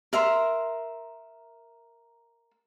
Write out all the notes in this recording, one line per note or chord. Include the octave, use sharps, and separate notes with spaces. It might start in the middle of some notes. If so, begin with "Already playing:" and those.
A#4 E5 A#5 C6